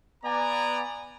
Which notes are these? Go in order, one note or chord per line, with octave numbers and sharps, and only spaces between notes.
B3 D5 G#5 A#5